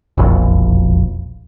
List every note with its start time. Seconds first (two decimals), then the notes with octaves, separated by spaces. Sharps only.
0.18 E1 A#1 F2